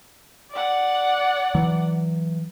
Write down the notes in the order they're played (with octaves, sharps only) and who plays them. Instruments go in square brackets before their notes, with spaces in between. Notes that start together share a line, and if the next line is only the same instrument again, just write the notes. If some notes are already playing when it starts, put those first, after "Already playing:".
[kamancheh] D5 F#5
[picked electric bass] E3 F#3